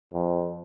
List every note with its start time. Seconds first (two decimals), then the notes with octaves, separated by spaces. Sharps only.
0.14 F2